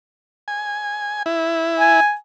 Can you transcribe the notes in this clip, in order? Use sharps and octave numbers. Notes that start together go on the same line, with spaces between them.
G#5
E4
G#5